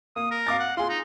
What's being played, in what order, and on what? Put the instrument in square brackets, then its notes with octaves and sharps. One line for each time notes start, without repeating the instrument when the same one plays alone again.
[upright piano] A#3 [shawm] D#6
[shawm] A#4
[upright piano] F5 D6 A6
[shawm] F#5
[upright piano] F4 G#4 [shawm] C6
[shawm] D#4